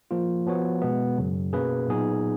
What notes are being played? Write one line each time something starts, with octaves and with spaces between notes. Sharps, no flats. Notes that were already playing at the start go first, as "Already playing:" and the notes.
F3 A#3 F4
F3 B3 F#4 C#5
B2 G#3 B3
F#2 C#3 F#3
B2 A#3 C#4 G#4 B4
A#2 F#3 B3 D#4 G#4